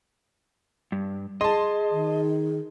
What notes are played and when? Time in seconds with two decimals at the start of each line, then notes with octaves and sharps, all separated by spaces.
0.92 G2
1.41 G#4 D#5 A5 C6
1.91 D#3